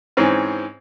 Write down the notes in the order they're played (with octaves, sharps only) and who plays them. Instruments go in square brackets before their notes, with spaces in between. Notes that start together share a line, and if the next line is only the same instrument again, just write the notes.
[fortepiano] G#2 E3 C4 C#4